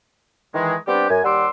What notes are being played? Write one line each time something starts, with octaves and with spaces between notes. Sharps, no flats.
D#3 E3 G#3
G3 B3 C4 D4 G4
F#2 G#5
D#2 G3 F#5 C6 D6 E6